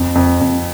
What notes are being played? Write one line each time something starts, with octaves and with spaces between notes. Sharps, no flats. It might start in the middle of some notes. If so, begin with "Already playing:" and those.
Already playing: F2
F2
F2